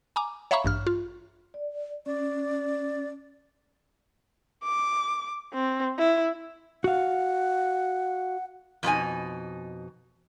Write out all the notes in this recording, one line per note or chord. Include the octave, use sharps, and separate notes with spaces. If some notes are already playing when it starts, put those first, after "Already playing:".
G#5 A#5 D6
C#5 E5 F5 A#5 B5 C#6
A1 G2 F6
F4
D5
C#4 D5
D6
C4
E4
F#4 F5 F#5
F2 B2 D#4 G#5